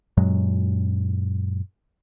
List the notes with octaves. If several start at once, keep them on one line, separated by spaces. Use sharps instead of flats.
F#2 A#2 F#3 G#3